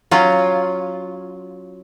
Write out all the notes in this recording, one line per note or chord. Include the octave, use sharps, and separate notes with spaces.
F#3 C#4 F4